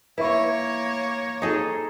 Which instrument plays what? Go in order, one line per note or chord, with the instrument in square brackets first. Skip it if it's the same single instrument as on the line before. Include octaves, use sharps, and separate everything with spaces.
[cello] A#3 C#5 [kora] E4 [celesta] B4 E5 C#6
[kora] D#4 G#4 A4